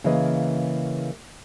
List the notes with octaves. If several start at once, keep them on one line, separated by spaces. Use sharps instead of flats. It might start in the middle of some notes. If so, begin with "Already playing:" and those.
C#3 E3 A#3 B4 D#5